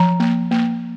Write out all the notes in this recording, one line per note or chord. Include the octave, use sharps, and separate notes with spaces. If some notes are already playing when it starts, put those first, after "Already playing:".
Already playing: F3 A#5
A#3
A#3